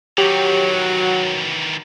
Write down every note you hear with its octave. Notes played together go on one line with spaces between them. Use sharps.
D#3 E3 F#3 G4